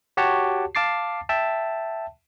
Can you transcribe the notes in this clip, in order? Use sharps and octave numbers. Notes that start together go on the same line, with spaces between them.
F#4 G4 C#5 F#5 A5
F5 A5 D6 A6 C7
E5 G5 A5